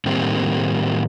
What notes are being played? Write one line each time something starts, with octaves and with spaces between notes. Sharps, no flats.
A2 D#3 G3 A#3 C4